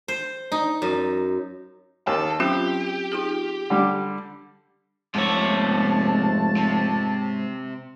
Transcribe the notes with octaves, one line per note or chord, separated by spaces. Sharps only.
C5
D#4
F#2
D#2 A4 A5
F#3 C4 C#4 F4 G4
D#4 F4 G#4
D3 G3
F1 G#2 C3 C#5 A5
C3